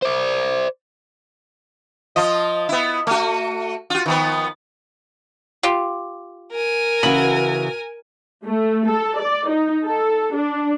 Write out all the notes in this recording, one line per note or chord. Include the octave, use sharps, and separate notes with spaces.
C5 D5
F3 F4 D#5
B3 E4
A3 F#4
F4 F#4
D#3 F3 B3
F4 G4
A#4 G#5
C#3 E3 F#4 B5
A3
A4
D5
D#4
A4
D4